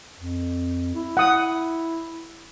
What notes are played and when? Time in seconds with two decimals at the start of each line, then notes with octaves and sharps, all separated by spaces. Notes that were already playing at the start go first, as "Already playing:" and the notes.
0.18 F2
0.95 E4
1.17 F#5 D#6